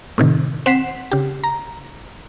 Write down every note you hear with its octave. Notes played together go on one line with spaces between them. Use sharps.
A2 C3 D#3
C4 F#5 B6 C7 E7
C#3 G4
A#5